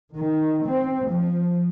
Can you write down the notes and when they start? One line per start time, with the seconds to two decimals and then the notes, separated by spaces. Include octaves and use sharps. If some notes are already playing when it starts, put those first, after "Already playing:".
0.16 D#3
0.68 C4
1.11 F3